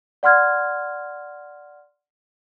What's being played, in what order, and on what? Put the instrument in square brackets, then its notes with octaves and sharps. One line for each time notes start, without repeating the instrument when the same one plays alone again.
[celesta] D5 F#5 C6 F6 G#6